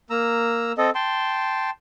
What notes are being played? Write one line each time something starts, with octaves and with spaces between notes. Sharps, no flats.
A#3 A#5 E6
C4 A4 D#5
G5 A5 C6